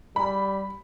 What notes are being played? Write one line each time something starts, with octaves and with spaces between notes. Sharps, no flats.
G3 B5